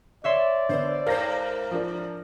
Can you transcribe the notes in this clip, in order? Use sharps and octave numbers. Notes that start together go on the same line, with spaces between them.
C#5 D5 E5 C6
D3 B3 C5
G#2 A#4 C5 F5 A#6
F3 D4 A#4